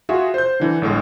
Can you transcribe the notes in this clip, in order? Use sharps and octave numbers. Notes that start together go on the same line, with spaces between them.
F4 F#4 G#4 E5
C5 G6
D3 E3
G1 A2 G#3